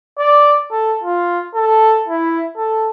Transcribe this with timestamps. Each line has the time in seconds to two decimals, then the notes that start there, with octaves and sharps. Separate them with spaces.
0.19 D5
0.71 A4
1.04 F4
1.55 A4
2.08 E4
2.57 A4